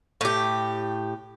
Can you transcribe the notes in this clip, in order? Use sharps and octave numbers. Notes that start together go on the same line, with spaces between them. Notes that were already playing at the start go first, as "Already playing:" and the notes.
A2 G4